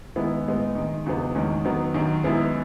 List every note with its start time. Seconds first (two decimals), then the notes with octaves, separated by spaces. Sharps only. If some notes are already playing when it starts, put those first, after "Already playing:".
0.16 F#2 D#3 G#3 B3 E4
0.46 A2 G#3 B3
0.75 D#3 G#3 D#4
1.06 E2 C#3 F#3 B3 D#4
1.35 E2 D#3 G#3 C#4
1.65 D#3 F#3 B3
1.94 F#2 D#3 F#3
2.24 F#2 D#3 G#3 B3 E4